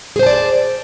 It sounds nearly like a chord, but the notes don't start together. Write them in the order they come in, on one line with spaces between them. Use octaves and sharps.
G#4 C5 A5 D5